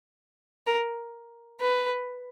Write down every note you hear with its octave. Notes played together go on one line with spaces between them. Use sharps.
A#4
B4